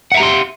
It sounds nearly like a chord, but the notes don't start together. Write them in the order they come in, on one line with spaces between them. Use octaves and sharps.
F#5 E5 A#5 G4 C6